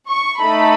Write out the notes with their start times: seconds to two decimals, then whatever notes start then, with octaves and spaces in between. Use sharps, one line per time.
0.09 C#6
0.41 A3 D#4 A4 B5